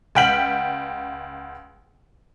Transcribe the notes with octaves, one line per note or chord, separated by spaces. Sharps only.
C#2 F#5 G5 F6 B6 F#7